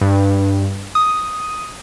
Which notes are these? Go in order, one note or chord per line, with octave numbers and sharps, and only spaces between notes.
G2
D#6